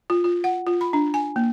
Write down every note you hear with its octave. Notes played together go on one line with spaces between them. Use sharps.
F4
F4
F#5
F4
B5
D4
G#5
A#3